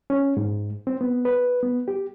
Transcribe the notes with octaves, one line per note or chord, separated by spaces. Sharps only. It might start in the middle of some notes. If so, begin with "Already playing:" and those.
C#4
G#2
C4
B3
B4
B3
G4